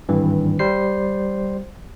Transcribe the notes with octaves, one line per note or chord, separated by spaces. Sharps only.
G#1 G2 E3
G3 C5 C7